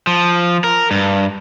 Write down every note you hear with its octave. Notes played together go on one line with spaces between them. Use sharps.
F3
A#4
G2